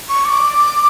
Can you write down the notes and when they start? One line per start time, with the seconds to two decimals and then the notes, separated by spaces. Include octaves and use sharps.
0.09 C#6
0.25 D6